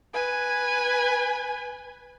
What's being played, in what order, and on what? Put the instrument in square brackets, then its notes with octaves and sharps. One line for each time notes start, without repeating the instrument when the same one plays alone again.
[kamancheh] B4 G#5